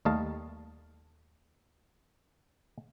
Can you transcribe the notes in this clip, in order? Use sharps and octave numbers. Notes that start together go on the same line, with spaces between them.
D#2 G3 A3 D#5 F5 A5